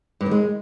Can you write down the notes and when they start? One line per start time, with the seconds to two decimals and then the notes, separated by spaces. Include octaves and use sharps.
0.21 G2
0.26 D#3
0.31 G#3